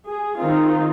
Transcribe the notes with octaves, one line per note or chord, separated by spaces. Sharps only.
G#4
D#3 C4 D#4 F4